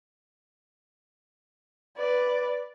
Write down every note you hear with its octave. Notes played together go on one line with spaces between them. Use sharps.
B4 D5